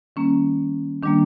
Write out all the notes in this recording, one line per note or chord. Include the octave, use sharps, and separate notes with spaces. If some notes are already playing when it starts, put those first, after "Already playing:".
D#3 G3 A#3 C#4
D#3 G3 A#3 D4